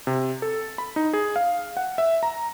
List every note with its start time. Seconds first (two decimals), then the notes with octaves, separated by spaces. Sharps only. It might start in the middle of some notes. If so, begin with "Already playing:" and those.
0.07 C3
0.42 A4
0.78 B5
0.96 D#4
1.13 G#4
1.36 F5
1.77 F#5
1.98 E5
2.23 A#5